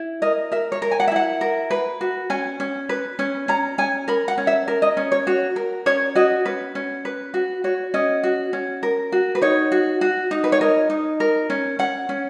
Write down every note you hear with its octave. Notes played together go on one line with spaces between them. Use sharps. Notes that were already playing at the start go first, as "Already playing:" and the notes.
Already playing: E4
A#4 D#5
A#4 E5
C#5
A#4
G#5
F#5
E5
E4 F#5
A#4
B4
F#4
C#4 G#5
C#4
B4
C#4
C#4 A#5
C#4 G#5
A#4 B5
F#5
C#4
E5
A#4
D#5
C#4
C#5
F#4 C#5
A#4
C#4 C#5
F#4 D#5
C#4 B4
C#4
B4
F#4
F#4 C#5
C#4 D#5
F#4
C#4
A#4
F#4
B4
D#4 C#5
F#4
F#4
D#4
B4
C#5
A#4 D#5
D#4
A#4
C#4
C#4 F#5
C#4